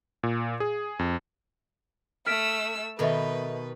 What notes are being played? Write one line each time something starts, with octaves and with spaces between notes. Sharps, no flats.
A#2
G#4
F2
A3 E6 F6 B6 D7
B2 D#3 D#4 A4 B4 D#5 E5